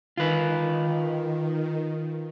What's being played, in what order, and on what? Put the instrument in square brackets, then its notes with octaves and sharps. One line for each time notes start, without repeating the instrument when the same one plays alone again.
[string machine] D#3 [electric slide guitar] F4 B4